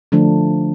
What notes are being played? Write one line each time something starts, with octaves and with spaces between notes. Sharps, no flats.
D3 F3 A3 D4